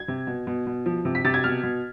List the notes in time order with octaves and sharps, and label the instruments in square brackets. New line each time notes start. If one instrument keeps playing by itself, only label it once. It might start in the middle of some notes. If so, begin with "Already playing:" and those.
Already playing: [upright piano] G#6
C3
B2
B2
B2
F3
C3
B6
C3 A6
G#6
B2 F6
B2